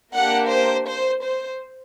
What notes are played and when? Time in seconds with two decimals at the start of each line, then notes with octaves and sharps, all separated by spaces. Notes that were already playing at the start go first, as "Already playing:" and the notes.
0.14 A#3 D4 G4 F#5
0.50 C5
0.88 C5
1.24 C5